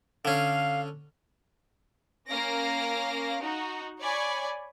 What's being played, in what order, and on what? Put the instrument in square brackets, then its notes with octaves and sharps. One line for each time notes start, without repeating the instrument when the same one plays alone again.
[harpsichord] D3 C#4 [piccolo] F5
[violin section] A#3 C#4 F5 A#6 D7
D#4 F#4
C#5 D5 G#5 B5 C#6